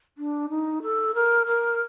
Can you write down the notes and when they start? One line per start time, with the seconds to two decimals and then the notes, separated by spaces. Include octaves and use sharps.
0.18 D4
0.50 D#4
0.83 A4
1.15 A#4
1.47 A#4